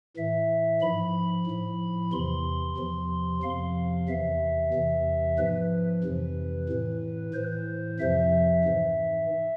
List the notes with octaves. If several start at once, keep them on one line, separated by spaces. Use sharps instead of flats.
A2 E3 E5
G#2 F3 B5
A2 F3
E2 C3 E3 C6
E2 C3 F3
F2 C3 F3 F5
E2 C3 E3 E5
E2 C3 E3
G#2 F3 B4
F2 C3 E3
A2 E3
A2 E3 C5
F2 C3 F3 E5
G#2 E3